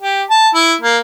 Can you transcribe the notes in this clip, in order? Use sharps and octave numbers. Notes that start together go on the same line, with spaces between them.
G4
A5
E4
A#3